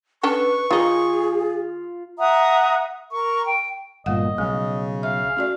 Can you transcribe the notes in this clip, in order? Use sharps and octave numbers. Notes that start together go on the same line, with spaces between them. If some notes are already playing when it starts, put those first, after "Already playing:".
C#4 D4 A4 B4 C#6
D#3 D#4 F4 G#4
E5 F#5 A#5 D#6
A#4 C#6
G5
G1 A#2 G3 D#5 F5 F#5
B1 C#3 G#3 C#4
E5 F5
A3 C#4 F#4 D5